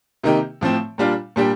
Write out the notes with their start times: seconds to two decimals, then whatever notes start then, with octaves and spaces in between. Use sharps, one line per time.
0.23 C3 D#3 A#3 D#4 G4
0.61 A2 F3 C4
0.98 A#2 G3 D4 F4
1.36 A#2 G3 D4 G4